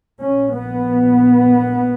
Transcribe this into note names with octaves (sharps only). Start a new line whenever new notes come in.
A#1 A#2 C#4
B3